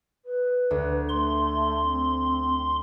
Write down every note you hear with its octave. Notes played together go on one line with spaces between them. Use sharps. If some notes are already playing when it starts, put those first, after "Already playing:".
B4
D2
A3 C6
C4